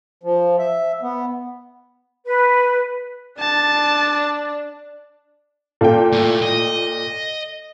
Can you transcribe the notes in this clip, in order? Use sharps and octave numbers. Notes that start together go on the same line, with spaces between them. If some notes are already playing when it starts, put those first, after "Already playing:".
F3
E5
B3
B4
D4 A5
A#2 A4 F5 G5
A2
D#5